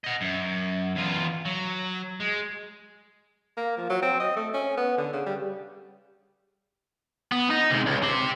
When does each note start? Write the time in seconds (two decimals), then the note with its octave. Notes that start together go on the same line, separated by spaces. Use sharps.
0.04 D#5 F#5
0.21 F#2
0.95 E2 F4
1.45 F#3
2.20 G#3
3.57 A#3
3.77 F3
3.90 F#3
4.02 C4
4.19 D#5
4.36 A3
4.54 C#4
4.77 B3
4.98 D3
5.13 C#3
5.26 G3
7.32 B3
7.50 D#4
7.70 C3 G#3
7.86 C#2
8.03 G4 C6